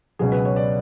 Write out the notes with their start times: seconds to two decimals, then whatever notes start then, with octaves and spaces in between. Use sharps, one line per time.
0.19 C#2 B2 F#3 G#4
0.32 B4
0.45 C#5
0.56 D5